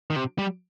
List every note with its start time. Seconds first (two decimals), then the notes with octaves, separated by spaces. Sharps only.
0.10 D#3
0.16 C3
0.38 G3